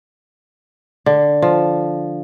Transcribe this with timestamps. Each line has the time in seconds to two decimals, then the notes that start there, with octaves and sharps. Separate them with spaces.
1.06 D3
1.42 F3